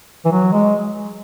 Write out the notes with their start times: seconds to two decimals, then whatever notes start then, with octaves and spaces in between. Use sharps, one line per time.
0.25 E3
0.32 F#3
0.53 G#3